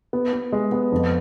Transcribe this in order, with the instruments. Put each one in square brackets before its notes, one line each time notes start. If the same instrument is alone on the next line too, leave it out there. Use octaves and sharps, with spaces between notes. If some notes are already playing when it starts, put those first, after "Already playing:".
[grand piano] B3
B3
G#3
B3
F2